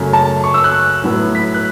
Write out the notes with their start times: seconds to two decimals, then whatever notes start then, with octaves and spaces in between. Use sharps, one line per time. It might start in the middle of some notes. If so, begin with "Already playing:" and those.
Already playing: F#2 C#3 A3 C#4
0.13 A5
0.44 C#6
0.54 E6
0.64 F#6
1.04 A2 F#3 B3
1.35 B6
1.54 F#6